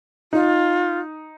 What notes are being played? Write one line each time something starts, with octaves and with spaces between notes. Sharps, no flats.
D#4 F4